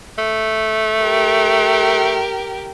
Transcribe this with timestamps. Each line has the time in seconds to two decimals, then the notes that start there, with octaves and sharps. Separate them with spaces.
0.18 A3
1.02 G4 A#4